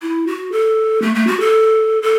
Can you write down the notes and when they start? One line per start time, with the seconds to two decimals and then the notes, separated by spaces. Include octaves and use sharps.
0.02 E4
0.27 F#4
0.52 A4
1.02 A3
1.15 A3
1.27 F#4
1.40 A4
2.03 A4